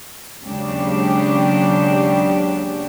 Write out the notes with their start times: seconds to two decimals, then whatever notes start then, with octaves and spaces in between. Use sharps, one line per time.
0.44 D#2 C#3 F#3 G#3 D4 G4